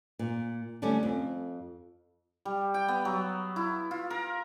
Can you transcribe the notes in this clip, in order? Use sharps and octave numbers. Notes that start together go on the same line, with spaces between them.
A#2
D3 G3 A3 C#4
F2
G3
G5
B3
F#3
E4
F4
A#4